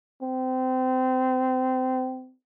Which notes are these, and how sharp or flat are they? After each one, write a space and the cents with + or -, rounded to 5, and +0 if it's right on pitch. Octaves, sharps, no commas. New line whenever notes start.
C4 -25